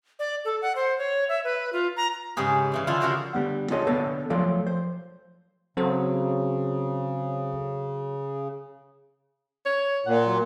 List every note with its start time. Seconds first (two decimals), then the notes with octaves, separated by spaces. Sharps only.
0.19 D5
0.45 A4
0.62 F#5
0.76 C5
0.98 C#5
1.29 E5
1.44 B4
1.73 F4
1.97 A#5
2.36 G#2 C#3 G4 G#4 B4
2.72 C#3 E3 G3
2.87 D3 F3 E4 F4
3.00 C#3 E4 F#4 A#4 C5 C6
3.33 D3 G3 B3 F#5
3.70 D4 F4 G#4 A4 C#5 D#5
3.87 D3 B3 A4 C#5 A5
4.30 F3 F#3 A3 F4 A4 D5
4.67 C5
5.77 C#3 F#3 C4 A4 C5
9.66 C#5
10.06 A#2 F#5
10.26 F#3